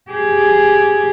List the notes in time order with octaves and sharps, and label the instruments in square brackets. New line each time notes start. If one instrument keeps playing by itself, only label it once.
[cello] G4 G#4